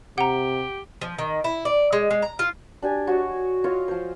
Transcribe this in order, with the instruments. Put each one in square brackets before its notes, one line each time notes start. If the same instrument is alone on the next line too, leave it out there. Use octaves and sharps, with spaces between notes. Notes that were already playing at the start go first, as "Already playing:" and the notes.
[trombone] C3 [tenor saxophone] G4 [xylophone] F#5 A#5
[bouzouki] F3
D#3
E4
D5
G#3
G#3
A#5
F4
[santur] D4 G4 G#5
F#4 C#5 D#5
F4 C#5 D#5 F5
F3 C5